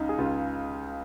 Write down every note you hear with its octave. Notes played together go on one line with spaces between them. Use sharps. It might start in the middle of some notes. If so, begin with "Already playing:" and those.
Already playing: C#2 C#3 D#4
G#4
C#2 C#3 F4